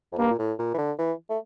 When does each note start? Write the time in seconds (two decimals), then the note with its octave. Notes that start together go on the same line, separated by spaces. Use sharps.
0.12 F2
0.18 G2 A#3
0.30 A#2
0.39 A2
0.59 A#2
0.74 E3
0.78 D3
0.98 E3
1.30 A3